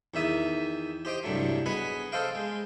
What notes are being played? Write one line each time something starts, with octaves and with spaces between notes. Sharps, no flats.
E2 D#3 E5 D#6
G4 C5 D#5 G5
C2 G2 F#3 A3
B3 G#4 B4 D#5 G#5
A4 C5 D#5 F5 G5
G#3